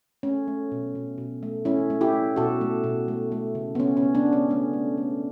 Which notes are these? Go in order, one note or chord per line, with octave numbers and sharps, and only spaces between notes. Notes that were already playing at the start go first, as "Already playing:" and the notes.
A3 C#4
A3
B2
B2
B2
A3
A3 C#4 E4
A3
E4 G4
A3
B2 F#4 A4
A3
B2
A3
A3
C#3
B3
C#3 C#4
C#4
C#3
B3 D4
C#3
C#4
A3 C#4
A3
A3